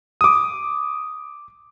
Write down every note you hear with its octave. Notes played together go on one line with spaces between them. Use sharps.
D6 D#6